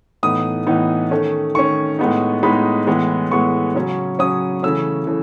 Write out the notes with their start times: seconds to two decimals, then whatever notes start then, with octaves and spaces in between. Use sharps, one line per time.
0.23 A2 E3 B3 D#4 D#6
0.67 A2 E3 B3 D#4
1.11 D#3 A3 C#4
1.55 D#3 A3 C#4 C#6
1.99 A2 G#3 B3 D#4
2.43 A2 G#3 B3 D#4 B5
2.87 A2 E3 G#3 B3
3.31 A2 E3 G#3 B3 C#6
3.75 C#3 F#3 C#4
4.19 C#3 F#3 C#4 D#6
4.63 C#3 E3 A3 C#4 E6
5.07 C#3 E3 A3